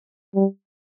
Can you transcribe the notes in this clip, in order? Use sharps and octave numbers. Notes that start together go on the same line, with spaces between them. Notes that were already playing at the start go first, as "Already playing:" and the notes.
G3